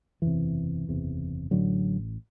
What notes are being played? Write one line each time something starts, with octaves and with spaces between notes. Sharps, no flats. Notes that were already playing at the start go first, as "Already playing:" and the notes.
F#1 E2 C3 E3
F#1 E2 C3
A1 A2 D3 F#3